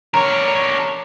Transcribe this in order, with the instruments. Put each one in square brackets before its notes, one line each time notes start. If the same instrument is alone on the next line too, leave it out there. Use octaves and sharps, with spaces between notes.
[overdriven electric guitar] D4 A#4 [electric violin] C#5 [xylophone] A#5